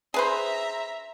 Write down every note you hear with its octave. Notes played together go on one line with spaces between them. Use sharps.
G#4 B4 C5 E5 A#5